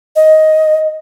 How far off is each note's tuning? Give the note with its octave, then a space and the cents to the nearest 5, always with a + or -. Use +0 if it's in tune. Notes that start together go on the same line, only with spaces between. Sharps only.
D#5 +10